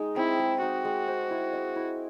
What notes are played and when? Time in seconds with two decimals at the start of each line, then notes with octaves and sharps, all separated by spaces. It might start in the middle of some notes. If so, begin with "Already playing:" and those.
Already playing: G#3 D#4
0.16 C4 E4
0.39 G#3
0.62 D#4 F#4
0.85 G#3
1.08 C5
1.31 E4
1.53 D#5
1.76 E4